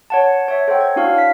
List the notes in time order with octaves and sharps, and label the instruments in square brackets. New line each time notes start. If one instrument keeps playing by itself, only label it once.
[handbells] C#5 F#5 A5
C#5 E5
A4 C5 C#5 F#5 G5
G#6
D4 E4 F#4 F5 C#6 F6
F5 B6